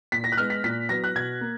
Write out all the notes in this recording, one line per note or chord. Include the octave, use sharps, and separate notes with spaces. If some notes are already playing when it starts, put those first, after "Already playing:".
A#2 B6
A#6
F#6
G#3 B3 F6
B6
A#2 B6
F#3 B3 A#6
F#6
B2 G#6
A#3